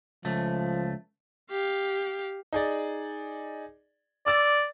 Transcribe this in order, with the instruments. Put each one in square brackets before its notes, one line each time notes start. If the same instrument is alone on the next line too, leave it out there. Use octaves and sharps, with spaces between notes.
[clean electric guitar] C#2 A3 [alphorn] F3
[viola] G4 F5
[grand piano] D#4 G#4 D5
[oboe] D5 [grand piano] D6 E6 A6